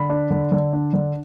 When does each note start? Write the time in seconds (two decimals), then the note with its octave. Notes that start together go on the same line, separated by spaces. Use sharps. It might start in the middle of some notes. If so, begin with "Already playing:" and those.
Already playing: D3 B5
0.10 D4
0.31 D3
0.52 D3
0.73 D4
0.93 D3